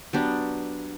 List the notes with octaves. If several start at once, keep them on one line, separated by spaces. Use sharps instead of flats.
F#3 B3 D4 G4